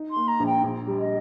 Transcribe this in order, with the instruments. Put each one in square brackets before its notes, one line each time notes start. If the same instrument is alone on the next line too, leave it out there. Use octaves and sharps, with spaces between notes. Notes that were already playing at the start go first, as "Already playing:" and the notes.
Already playing: [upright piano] D#4
[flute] C6
[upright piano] A#3
[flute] A#5
[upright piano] A#1
[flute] G5
[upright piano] A#1
G3
[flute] D#5